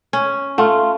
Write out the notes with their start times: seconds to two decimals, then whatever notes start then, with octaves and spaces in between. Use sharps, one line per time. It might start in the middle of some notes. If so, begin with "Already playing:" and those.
0.13 C#4
0.58 A3 F4